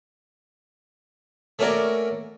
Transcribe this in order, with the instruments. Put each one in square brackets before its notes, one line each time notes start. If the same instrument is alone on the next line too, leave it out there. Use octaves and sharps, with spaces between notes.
[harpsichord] A3 A#3 C#4 F#4 A#4 D5